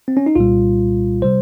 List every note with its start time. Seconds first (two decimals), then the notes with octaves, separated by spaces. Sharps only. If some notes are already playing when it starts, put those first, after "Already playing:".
0.08 C4
0.17 C#4
0.26 D#4
0.35 C2 A#2 G3 F4
1.22 C3 G3 C5